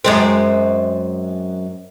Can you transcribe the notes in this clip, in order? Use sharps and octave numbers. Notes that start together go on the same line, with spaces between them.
F#2 G#3 C4